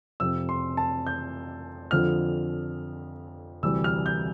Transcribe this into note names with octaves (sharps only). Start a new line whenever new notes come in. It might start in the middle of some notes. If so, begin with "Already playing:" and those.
F2 C3 F3 E6
C6
A5
G6
F2 D3 F3 F6
D2 C3 E3 G3 E6
F6
G6